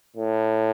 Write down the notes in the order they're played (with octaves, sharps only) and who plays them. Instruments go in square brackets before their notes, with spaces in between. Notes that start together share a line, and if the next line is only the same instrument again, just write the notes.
[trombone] A2